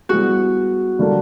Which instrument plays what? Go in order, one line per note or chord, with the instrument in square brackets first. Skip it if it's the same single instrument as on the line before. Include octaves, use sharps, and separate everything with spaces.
[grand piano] G3 B3 E4 G#4 [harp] F#4
[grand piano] D3 G3 A#3 D4